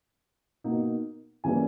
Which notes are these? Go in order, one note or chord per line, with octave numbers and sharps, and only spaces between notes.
B2 A#3 D#4
C#3 E3 G3 A#3 C#4 G#5